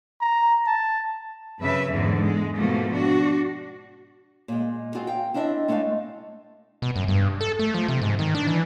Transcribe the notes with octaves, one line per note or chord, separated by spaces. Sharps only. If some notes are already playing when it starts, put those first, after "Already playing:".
A#5
A5
F#2 C#3 B4 E5
E2 G#2 D3 E3
G#3
G#2 B2 F3 A3 A#3
D4 F#4
A#2 G#3
C4 F4 F#4 G#4
F5 G5
C4 D4 E4 D#5 E5
G#3 A3 D4 F4 F5
B2
F#2
G2
A4
A3
F3
C3
G#2
D#3
D4
E3